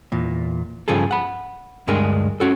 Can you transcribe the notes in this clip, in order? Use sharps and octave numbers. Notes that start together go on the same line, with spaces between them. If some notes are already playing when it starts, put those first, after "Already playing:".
E2 A#2
G2 C#3 F3 G#4 A4
F#5 B5
D2 G2 G#3 D4 G#4 A#4
C#4 F#4 A4